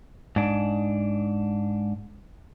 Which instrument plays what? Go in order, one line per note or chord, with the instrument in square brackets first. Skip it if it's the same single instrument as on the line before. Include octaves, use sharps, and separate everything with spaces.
[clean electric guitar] G#2 D4